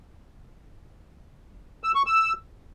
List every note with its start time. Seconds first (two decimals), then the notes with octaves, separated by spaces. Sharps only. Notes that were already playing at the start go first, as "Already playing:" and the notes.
1.84 E6
1.95 C#6
2.06 E6